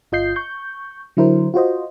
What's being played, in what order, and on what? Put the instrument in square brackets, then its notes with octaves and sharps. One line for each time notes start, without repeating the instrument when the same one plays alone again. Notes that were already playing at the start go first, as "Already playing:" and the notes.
[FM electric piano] G1 F4 D#5 G6 C7
C#6 G6
D3 F#3 E4 A#4 C5
F4 F#4 C5 D#5